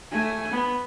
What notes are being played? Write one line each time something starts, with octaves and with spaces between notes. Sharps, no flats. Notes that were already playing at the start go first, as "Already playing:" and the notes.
A3 G#5
B3